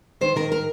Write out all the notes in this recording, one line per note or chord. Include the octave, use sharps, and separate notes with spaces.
D#3 C5
D#3 A#4
A#4